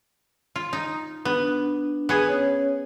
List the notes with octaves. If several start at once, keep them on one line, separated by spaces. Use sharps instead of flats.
F4
D#4
B3 D4
B3 G#4
C#4 C#5